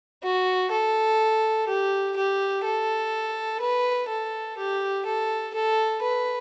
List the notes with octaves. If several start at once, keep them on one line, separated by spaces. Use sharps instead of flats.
F#4
A4
G4
G4
A4
B4
A4
G4
A4
A4
B4